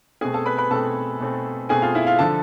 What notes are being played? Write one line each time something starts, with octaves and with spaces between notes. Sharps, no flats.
B2 A3 C4 G#4 G#5
A4 A5
B4 B5
B4 B5
B2 A3 C4 A4 A5
B2 A3 C4
B2 A3 C4 G#4 G#5
F4 F5
E4 E5
F4 F5
D3 F3 A4 A5